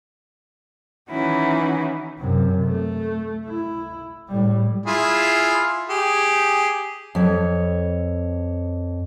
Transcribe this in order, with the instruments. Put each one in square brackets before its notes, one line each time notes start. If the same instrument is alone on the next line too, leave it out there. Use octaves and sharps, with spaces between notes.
[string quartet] D#3 E3 C#4 D#4 E4 F#4
[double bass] F#2 C3
A3
E4
A2 G3
[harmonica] E4 F4 G#4
G4 G#4
[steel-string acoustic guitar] F2 C#5